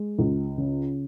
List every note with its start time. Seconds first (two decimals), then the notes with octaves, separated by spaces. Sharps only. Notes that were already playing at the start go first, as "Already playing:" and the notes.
Already playing: G#3
0.19 C#2
0.58 C#3